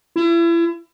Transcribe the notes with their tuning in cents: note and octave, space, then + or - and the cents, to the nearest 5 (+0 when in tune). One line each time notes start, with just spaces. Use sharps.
E4 +35